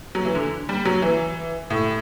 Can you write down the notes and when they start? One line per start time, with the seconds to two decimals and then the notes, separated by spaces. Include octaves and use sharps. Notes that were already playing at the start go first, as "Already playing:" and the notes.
0.15 F#3
0.25 E3
0.35 D3
0.69 G3
0.85 F#3
1.02 E3
1.70 A2